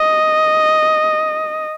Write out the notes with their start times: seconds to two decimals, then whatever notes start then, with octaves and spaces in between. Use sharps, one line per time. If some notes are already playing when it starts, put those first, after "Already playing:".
Already playing: D#5